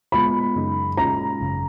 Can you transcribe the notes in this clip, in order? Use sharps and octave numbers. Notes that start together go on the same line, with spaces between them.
A#2 G#3 B3 F4 B5
F#2 C#3 G#3 D#4
A#2 G#3 C#4 F4 A#5
G#1 F#2 C#3